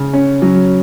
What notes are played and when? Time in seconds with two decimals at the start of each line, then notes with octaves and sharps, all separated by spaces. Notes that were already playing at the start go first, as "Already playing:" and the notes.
Already playing: C#3
0.13 C#4
0.42 F#3